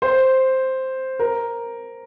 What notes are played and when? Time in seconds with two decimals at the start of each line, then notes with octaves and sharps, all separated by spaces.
0.02 C5
1.19 A#4